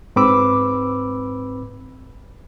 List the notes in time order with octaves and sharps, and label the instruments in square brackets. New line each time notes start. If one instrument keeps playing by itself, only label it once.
[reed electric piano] G#2 C4 B4 B5 D6 E6